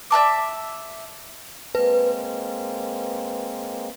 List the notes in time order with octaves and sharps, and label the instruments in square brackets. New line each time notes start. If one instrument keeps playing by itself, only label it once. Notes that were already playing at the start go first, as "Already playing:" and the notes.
[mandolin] D5 E5 A5 D6
[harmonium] G#3 A#3 C4 [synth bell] B4